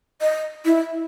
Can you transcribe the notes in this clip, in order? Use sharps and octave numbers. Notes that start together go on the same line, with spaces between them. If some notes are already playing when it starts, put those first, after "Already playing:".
D#5
E4